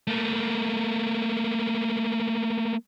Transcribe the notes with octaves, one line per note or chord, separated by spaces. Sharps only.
A3 A#3